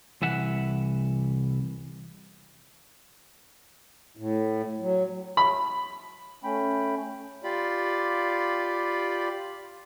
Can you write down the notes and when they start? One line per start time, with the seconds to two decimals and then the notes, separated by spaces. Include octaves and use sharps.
0.22 C2 E3 E5 F#5
4.17 A2
4.80 F#3
5.37 B5
6.44 A3 C#4 G5 B5
7.44 F4 G4 D5 B5